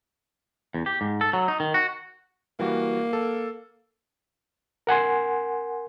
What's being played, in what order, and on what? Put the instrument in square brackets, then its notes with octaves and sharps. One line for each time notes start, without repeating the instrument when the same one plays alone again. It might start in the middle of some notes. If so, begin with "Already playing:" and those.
[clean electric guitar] E2
G4
G#2
A4
F#3
D#4
D#3
F#4
[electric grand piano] E3 G3 F#4 [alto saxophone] A#3
[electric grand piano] A4
[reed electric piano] A#4 F#5 G#5 C6